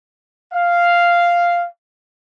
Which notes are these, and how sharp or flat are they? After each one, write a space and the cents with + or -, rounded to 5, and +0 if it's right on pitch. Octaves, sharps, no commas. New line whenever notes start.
F5 -5